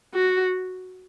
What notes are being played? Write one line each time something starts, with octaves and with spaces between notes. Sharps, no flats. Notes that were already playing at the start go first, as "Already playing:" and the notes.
F#4